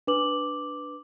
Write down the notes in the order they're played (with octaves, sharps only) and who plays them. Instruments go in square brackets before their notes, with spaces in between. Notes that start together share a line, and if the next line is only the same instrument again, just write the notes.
[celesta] D4 B4 D6 F#7